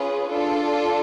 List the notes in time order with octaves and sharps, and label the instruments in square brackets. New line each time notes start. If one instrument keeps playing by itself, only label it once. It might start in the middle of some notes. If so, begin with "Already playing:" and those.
Already playing: [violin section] C#4 F4 G#4 B4
D4 F4 A4